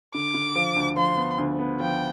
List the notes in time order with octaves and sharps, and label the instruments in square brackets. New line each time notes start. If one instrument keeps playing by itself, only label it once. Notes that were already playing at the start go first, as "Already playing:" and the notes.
[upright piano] D3 [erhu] D6
[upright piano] D3
F3
D2
[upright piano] F3 [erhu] C6
[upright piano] B3
D2
B3
[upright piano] F3 [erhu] G5